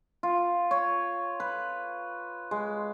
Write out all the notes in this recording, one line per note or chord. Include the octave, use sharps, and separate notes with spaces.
F4
C#5
B4
G#3